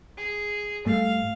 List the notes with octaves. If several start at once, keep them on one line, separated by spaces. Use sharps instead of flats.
G#4
G#2 G3 A3 F5